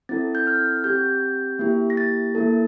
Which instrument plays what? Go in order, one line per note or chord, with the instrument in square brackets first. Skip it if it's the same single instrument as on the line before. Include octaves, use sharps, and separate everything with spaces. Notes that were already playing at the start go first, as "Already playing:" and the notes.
[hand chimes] C4 E4 A4 A6
G6
F6
C4 G4 G6
A#3 E4 G4
A#6
A6
A#3 E4 A4